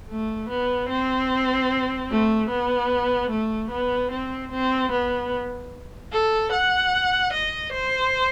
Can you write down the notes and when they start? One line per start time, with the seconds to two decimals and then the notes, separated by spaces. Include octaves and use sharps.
0.09 A3
0.49 B3
0.89 C4
2.10 A3
2.50 B3
3.30 A3
3.70 B3
4.11 C4
4.52 C4
4.91 B3
6.12 A4
6.52 F#5
7.33 D#5
7.72 C5